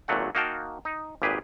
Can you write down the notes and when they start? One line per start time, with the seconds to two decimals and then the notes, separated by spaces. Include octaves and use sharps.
0.08 G#1 A#2 F#3 A3 F#5
0.35 A#3 D#4 F#4 F5 G5 A5
0.85 D#4
1.22 G#1 A#2 G4 G#4 B4